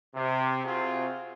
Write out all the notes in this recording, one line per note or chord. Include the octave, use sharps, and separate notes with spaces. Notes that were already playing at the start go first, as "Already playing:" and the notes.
C3
C3 C4 F4 F#4 G#4